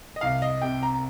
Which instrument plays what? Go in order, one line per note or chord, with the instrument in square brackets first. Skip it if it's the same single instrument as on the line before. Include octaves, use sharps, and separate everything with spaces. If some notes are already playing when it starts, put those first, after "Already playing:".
[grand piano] D#5
C2 F5
D#5
C3 G5
A#5